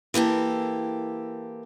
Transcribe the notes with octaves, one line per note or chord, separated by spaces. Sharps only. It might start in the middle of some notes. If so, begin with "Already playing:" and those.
E3 A#3 G4 A4